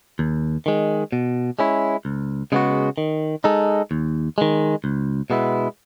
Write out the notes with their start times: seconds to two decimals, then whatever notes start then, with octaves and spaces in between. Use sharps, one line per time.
0.19 D#2
0.66 D#3 G#3
1.12 B2
1.59 G#3 C#4 E4
2.05 C#2
2.52 C#3 G#3 B3 F#4
2.98 D#3
3.44 G#3 D#4 A4
3.91 D#2
4.38 D#3 G#3
4.84 C#2
5.30 B2 G#3 B3 E4